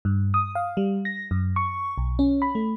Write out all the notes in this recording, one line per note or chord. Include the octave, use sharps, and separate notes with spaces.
G2
D#6
F5
G3
A#6
F#2
C#6
B1
C#4
B5
A3